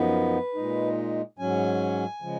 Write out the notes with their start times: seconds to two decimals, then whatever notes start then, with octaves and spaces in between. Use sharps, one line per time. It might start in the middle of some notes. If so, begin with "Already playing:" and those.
Already playing: F#2 F3 B3 D#4 B4
0.55 A#2 G#3 D#4
1.39 G#2 F#3 C#4 G#5
2.22 C#3 F3 G#3